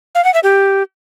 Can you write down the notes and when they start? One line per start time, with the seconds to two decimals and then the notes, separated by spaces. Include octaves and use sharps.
0.15 F5
0.24 F#5
0.34 E5
0.43 G4